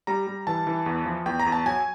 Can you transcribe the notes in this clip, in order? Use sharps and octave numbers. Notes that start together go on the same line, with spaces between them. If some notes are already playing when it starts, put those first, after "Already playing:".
G3 A#5
G3
E3 A5
E3
E2
F3
E2 G5
A#5
E2
A5
F#3 G#5